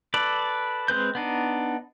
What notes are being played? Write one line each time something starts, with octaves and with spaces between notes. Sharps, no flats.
A4 B4 D5
G#3 C4 B4 G6
B3 D4 D#4